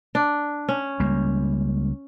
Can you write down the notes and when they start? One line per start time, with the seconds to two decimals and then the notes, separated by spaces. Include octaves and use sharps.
0.15 D4
0.69 C#4
1.00 C#2 G3 A#3